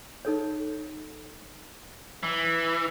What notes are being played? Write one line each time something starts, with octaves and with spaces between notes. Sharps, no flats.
D#4 A4 C#5
E3